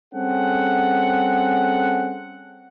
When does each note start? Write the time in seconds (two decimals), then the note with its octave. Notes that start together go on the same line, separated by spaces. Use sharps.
0.14 G3 C4 C#4 G#4 A4 F#5